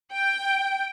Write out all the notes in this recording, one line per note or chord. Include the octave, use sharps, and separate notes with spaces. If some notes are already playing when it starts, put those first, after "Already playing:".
G5